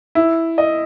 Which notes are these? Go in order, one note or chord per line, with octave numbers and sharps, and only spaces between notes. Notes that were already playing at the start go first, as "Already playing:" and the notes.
E4
D#5